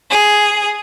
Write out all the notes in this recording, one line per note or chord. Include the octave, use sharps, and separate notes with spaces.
G#4